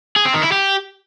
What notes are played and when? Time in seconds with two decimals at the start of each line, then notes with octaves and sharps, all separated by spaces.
0.16 G#4
0.25 C4
0.34 D#3
0.43 E4
0.52 G4